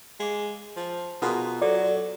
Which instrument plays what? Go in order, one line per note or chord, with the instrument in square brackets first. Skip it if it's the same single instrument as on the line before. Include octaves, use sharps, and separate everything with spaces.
[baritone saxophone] G#3 [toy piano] F5 D6
[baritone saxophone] F3
[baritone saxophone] B2 [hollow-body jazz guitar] F4 G#4 A#4 [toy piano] C6
[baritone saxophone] F#3 [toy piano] A4 C5 [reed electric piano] D5